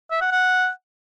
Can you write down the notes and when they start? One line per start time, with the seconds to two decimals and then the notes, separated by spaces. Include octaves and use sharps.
0.11 E5
0.21 F#5
0.32 F#5